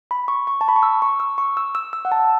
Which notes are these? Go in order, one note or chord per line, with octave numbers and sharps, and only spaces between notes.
B5
C#6
C#6
A5
B5
C#6
E6
C#6
E6
C#6
E6
E6
E6
F#5
A5